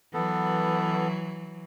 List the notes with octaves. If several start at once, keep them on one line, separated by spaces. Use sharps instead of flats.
E3 F#3 B3 A4